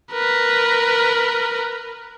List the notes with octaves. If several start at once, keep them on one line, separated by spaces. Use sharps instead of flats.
A#4 B4